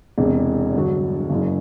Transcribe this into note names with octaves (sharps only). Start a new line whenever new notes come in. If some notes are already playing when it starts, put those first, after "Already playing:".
E1 E2 C3
G2 D3 F#3
F#1 F#2 C#3